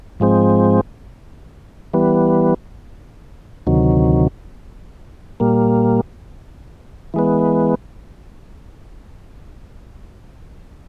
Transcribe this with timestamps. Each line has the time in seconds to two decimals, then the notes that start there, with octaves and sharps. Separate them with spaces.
0.20 G#2 F3 G#3 C4
1.94 E3 G3 B3
3.67 D2 C3 D#3 F#3
5.40 A#2 G3 A#3
7.14 E3 G#3 B3